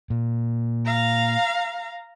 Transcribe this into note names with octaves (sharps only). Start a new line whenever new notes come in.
A#2
F5 A#5